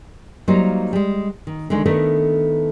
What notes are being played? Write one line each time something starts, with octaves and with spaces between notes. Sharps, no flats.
F#3 G3 A#3 D#4 F4 C5
G3 G#3
D#3
D3 D#3 G#3 D#4
D#3 A3 B3 D4 A4 A#4